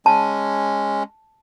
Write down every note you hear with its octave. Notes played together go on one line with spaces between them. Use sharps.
G#3 C#4 A5